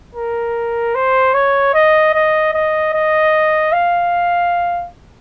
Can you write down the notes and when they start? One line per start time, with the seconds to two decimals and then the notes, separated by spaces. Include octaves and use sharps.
0.15 A#4
0.95 C5
1.34 C#5
1.74 D#5
2.14 D#5
2.54 D#5
2.93 D#5
3.72 F5